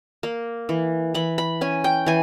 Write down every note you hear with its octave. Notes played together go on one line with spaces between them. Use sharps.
A#3
E3
E3 B5
B5
C#4 G#5
G5
E3 G#5